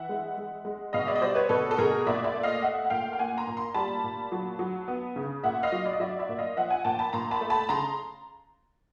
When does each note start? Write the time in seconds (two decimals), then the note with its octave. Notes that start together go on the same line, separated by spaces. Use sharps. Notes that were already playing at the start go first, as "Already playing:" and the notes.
Already playing: E3 E5 F#5
0.09 G#3
0.37 G#3
0.65 G#3
0.93 B2 D#5 F5
1.07 D5 E5
1.15 D#5
1.22 G3 C5 D5
1.35 B4 C#5
1.49 B2 A4 B4
1.71 A4
1.78 B2 G#4 A#4
2.07 A#2 D5 E5
2.24 D5 E5
2.34 A3
2.43 D#5 F5
2.62 A3 E5 F#5
2.85 F#5
2.90 A#2 F5 G5
3.13 G5
3.19 A#3 F#5 G#5
3.37 A#5 C6
3.47 A#2
3.57 A#5 C6
3.74 G3 A5 B5
4.04 A#2
4.32 F#3
4.59 F#3
4.88 B3
5.16 C#3
5.43 A#2 E5 F#5
5.63 D#5 F5
5.72 F#3
5.86 D5
5.93 D#5
6.00 F#3 D5 E5
6.19 D5 E5
6.29 A#2
6.39 D#5 F5
6.57 F3 E5 F#5
6.70 F#5 G#5
6.85 A#2 G5 A5
6.99 A5 B5
7.13 A#2 A#5 C6
7.31 A5 B5
7.41 A3
7.50 A5 B5
7.69 C#3 A#5 C6